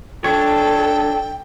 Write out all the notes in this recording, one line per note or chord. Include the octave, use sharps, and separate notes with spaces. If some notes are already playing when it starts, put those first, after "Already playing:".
D4 A4 C#5 G5